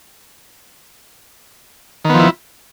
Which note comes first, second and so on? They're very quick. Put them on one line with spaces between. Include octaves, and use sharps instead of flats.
D#3 B3 F3 E4